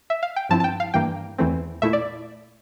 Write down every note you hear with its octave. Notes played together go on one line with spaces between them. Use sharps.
E5
F5
G5
G2 F3 C4 E4 A5
A5
G5
F5
G2 E3 A#3 G5
E2 E3 A3 C4
A#2 A3 E4 E5
D5